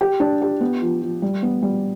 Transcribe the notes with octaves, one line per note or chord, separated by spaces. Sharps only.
G4
D4
G4
B3
F3
F3
G3
B3
G3